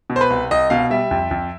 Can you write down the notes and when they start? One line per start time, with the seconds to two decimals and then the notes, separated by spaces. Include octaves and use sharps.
0.10 B2
0.16 C5
0.21 B4
0.30 C2
0.51 C2 D#5
0.70 B2 F5
0.90 G3 E5
1.11 F2
1.31 F2